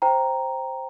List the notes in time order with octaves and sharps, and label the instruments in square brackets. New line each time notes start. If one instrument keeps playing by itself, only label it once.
[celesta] C5 G5 A#5